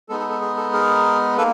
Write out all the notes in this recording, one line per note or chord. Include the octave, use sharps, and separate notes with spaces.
G#3 B3 D#4 A4
A4
A4
G#4
A4
G#4 A#4
A#3 A4 B4